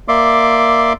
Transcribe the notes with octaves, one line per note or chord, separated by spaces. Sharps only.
A#3 D5 E5 C6 D6